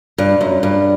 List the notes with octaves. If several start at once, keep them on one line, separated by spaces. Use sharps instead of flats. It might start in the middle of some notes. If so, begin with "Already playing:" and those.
G2
F#2
G2